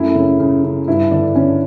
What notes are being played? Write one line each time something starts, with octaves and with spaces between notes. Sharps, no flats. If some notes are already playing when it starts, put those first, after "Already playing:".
Already playing: F#2 A3 E4
C#3 C#4
C#3
C#3
G2 E4
D3 D4
D3 C#4